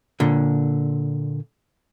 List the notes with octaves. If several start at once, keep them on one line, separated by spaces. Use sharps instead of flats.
A#2 D3